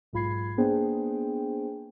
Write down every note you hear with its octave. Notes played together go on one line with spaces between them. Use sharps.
B1 G#2 F4 B5 G#6 C7
A#3 B3 D4 G#4 C5 G5